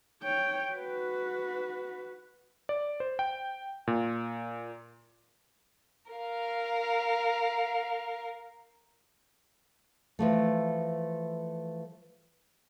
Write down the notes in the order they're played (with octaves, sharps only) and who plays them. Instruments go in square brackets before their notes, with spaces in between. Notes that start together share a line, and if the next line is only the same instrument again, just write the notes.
[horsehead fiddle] C#5 G5
F#4 B4
[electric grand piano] D5
C5
G5
A#2
[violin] A#4 F5
[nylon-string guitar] E3 F3 A3